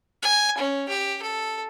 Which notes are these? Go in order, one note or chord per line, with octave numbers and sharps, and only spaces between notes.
G#5
C#4
G4
A4